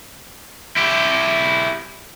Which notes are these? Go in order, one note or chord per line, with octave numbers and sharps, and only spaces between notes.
E4 G4